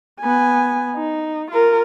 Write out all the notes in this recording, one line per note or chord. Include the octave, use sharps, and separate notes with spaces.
B3 G#5
D#4
F4 A#4